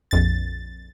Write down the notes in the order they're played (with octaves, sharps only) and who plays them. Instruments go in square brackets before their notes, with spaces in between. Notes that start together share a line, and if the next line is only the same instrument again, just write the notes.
[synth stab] A#1 F2 A6